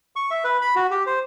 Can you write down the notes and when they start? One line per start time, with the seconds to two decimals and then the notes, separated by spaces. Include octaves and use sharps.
0.16 C#6
0.31 E5
0.44 B4
0.61 B5
0.76 F#4
0.91 G4
1.06 C5